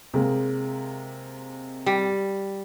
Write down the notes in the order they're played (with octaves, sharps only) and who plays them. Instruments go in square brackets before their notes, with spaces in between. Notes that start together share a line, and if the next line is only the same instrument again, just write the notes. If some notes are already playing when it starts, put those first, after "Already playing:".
[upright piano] C3 G#3 A#3
[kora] G3